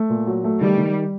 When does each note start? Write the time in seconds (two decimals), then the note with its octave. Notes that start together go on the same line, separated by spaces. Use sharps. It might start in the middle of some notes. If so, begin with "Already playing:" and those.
Already playing: A3
0.10 A#2
0.27 F#3
0.44 A3
0.61 D#3 G3
0.78 D#3